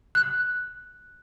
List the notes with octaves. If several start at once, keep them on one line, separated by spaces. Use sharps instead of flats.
F#6